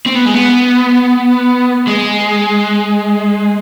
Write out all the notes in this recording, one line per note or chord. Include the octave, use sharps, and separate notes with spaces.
C4
B3
G#3
B3
G#3